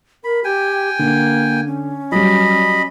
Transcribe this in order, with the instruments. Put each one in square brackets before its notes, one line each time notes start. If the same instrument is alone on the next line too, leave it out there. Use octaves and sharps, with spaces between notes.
[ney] A#4 [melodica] B5
[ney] G4 [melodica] G5 G#5
[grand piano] D3 [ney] A#3
[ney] C#4
[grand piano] F#3 G3 [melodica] D#5 B5